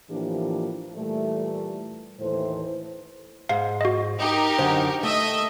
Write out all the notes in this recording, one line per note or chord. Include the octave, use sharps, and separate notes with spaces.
A2 E3 F3 A#3 D4 G4
A#2 E3 G3 A3
D#2 A2 E3 A4 C5
G#2 F5
F#4 D#5
D#4 G4 A#4
F#2 D3 C5
A3 D#5 E5